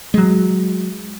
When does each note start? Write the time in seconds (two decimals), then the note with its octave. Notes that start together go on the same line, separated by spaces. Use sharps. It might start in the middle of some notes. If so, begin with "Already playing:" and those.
0.14 F#3 G#3